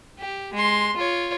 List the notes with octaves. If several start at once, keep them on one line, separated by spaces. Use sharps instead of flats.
G4
G#3 C6
F4 C#5